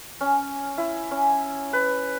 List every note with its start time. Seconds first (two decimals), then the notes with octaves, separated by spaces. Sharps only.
0.21 C#4
0.78 E4
1.11 C#4
1.73 B4